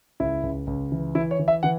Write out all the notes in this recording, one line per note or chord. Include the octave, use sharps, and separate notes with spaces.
C#2 E4
C#2
C#2
E3
E3 E4
C#5
E3
E5
E3 F#5